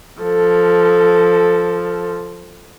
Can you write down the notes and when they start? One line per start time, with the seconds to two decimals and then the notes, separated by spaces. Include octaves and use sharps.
0.22 F3 A4